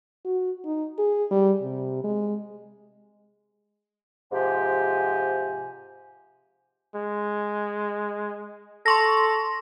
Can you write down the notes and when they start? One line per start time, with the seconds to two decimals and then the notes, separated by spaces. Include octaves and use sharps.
0.25 F#4
0.65 D#4
0.98 G#4
1.31 G3
1.62 C3
2.04 G#3
4.32 G#2 C3 F3 G4 G#5
6.95 G#3
8.86 A4 C6 C#6 A#6